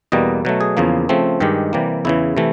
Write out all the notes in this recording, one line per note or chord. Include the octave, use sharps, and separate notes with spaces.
E2 B2 G3 A#3 D#5
B2 F#3 A3
G#4
E2 C#3 F3 A#3
C#3 F3 A3 C4
G2 D#3 G#3 G4
C3 E3 G3 A#3
E2 C#3 E3 E4
C3 E3 A3